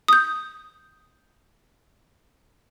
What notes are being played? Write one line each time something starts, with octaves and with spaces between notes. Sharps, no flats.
D#6 G6